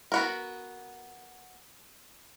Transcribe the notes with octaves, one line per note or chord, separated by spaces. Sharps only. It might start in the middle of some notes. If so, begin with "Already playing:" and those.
B3 F#4 A#4